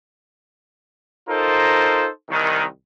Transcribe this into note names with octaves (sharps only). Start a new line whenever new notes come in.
D#4 F4 A4 A#4 C5
C2 D#3